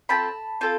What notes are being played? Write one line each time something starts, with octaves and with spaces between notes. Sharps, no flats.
C4 F4 A4 A5 B5
C4 F4 A4